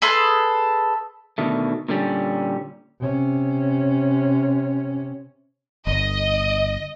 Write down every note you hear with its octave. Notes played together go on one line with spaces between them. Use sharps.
G#4 A4 B4 C6
B2 D3 D#3 A3
A#2 D3 G3 C#4
C3 C#4
G1 D#5